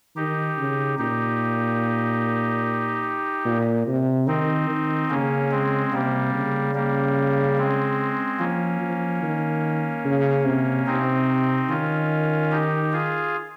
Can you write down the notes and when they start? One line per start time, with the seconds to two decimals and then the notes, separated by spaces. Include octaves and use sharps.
0.16 D#3 D#4 G4
0.58 C#3
0.99 A#2 D#4 G4
3.45 A#2
3.87 C3
4.27 D#3 C4 D#4
4.69 D#3
5.10 C#3 A#3 C#4
5.51 G#3 C4
5.93 C3 G3 A#3
6.34 C#3
6.75 G3 A#3
7.58 G#3 C4
8.39 F3 A#3 C#4
8.81 F3
9.22 D#3
10.05 C#3
10.45 C3
10.87 C3 C4 D#4
11.69 D#3 C#4 F4
12.51 D#4 G4
12.92 F4 G#4